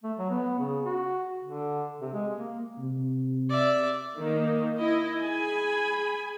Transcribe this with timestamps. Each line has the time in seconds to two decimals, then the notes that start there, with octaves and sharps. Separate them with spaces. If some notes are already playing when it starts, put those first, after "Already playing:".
0.04 A3
0.18 F#3
0.30 B3
0.59 C#3
0.85 F#4
1.44 D3
2.02 C3
2.13 G#3
2.35 A#3
2.79 C3
3.50 D5 E5
4.17 D#3 A#3
4.77 E4 D#5
5.21 G#4 G#5 B5